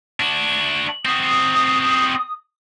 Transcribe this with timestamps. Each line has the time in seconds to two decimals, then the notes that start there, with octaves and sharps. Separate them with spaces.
0.20 D4 F#4
1.05 C4 F#4 D#6